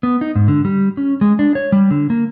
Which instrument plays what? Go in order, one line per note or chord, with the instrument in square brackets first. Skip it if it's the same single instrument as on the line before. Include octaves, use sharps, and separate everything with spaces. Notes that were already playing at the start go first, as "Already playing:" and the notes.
[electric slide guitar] B3
D#4
G#2
D3
G3
C#4
G#3
D4
C#5
G3
D3
A#3